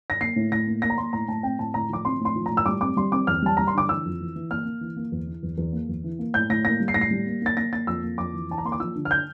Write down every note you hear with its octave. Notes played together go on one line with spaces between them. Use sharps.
A#6
A#3 C7
A2
A2 A#6
A#3
A#3 A#6
A#5
A#3 C6
A2 A#5
A2 A5
C4 G5
A2 A5
A2 A#5
F3 D6
C4 C6
A2
C6
F3
A#5
A2
E6
G3 D6
C4 D6
G3 C6
C4 D6
E2 F6
G3 A5
G3 A#5
C6
D3 D6
E3 E6
F2
E3
E3
A#3 F6
A#3
E3
A#3
E2
E3
E2
E2
A#3
E2
E3
A#3
A2 G6
A2 A#6
A#3 A#6
G3
C7
A2 A#6
C7
G3
A#3
A#3 A6
A#3 A#6
A#3 A6
F2 E6
A#3
F2 D6
E3
E3 A5
A#5
A#3 C6
D6
F3 E6
D3
F6
G6